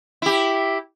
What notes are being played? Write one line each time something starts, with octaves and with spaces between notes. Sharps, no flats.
E4 G4